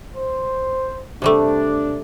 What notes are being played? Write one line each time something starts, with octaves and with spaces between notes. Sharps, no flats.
C5
C3 G3 A3 D4